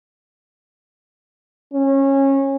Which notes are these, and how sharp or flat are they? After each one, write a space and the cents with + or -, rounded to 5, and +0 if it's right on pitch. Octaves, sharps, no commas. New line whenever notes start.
C#4 -25